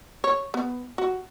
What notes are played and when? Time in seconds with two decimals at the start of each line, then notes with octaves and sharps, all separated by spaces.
0.24 C#5
0.54 B3
0.98 F#4